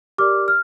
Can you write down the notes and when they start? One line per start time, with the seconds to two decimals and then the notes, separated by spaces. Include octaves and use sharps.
0.18 G4 A#4 D5 D6 F6
0.48 F6